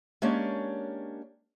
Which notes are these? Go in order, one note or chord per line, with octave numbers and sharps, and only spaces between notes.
G#3 A#3 C#4 D4 G4 C#5